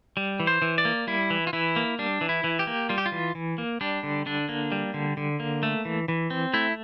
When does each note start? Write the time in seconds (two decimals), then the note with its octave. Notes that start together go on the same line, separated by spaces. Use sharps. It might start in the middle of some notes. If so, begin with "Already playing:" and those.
0.17 G3
0.40 E3
0.47 C5
0.62 E3
0.78 D5
0.85 A#3
1.07 G3 E4
1.30 E3
1.47 F4
1.53 E3 E4
1.76 A#3
1.99 G3 D4
2.21 E3
2.29 E4
2.44 E3
2.59 G4
2.67 A#3
2.89 G3 F4
2.98 G4
3.06 F4
3.12 E3
3.35 E3
3.58 A#3
3.81 G3 D4
4.03 D3
4.26 D3 D4
4.49 A#3
4.72 G3
4.94 D3
5.17 D3
5.40 A#3
5.63 A3
5.85 E3
6.08 E3
6.30 C4
6.54 A3 E4